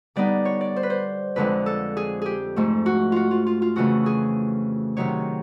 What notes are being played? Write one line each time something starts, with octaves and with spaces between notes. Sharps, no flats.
D3 G3 B3 D#4 D5
C#5
D5
C5
B4
C5
F2 D3 F3 G#3 C4 B4
A4
G#4
G4 G#4
G#2 F3 A3
F#4
F4 F#4
F4
F4
F4
F2 C#3 E3 A3 F#4
G#4
C3 D#3 F#3 C#5